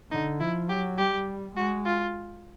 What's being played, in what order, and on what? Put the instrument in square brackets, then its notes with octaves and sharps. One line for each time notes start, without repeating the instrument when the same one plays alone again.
[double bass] D3 [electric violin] D#4
[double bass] F3 [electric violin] E4
[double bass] F#3 [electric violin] G4
[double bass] G3 [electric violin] G4
[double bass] G#3 [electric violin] F#4
[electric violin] F4